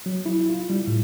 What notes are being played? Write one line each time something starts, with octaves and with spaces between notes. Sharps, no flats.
F#3
E4
F4
G3
A2